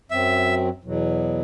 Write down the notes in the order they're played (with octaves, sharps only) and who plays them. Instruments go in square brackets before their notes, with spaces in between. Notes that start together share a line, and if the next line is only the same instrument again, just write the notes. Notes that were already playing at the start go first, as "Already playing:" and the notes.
[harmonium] F#2 F#3 C4 [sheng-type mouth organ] E5
[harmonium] E2 B2 F#3